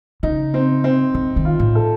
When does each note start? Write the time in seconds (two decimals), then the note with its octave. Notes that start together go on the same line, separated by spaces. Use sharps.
0.23 C#3 D#4
0.54 C4
0.84 C4
1.14 C3
1.36 D#3
1.45 F4
1.60 A2
1.75 A4